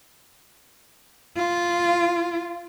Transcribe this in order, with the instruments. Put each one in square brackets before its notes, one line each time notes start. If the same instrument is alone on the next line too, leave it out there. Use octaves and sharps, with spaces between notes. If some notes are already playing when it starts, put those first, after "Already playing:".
[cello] F4